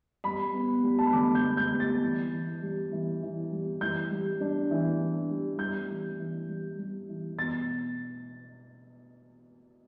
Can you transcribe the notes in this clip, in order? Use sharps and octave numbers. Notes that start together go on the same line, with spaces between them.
G3 B5
B3
G3
A5
B5
D3 D6
G6
B3
G6
G3
A6
E3
E3
G3
E3
E3
G3
E3 G6
G3
D4
E3
D4
G3
G3 G6
E3
E3
G3
G3
E3
B2 A6